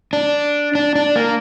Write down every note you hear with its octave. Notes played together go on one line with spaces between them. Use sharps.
D4
D4
D4
A#3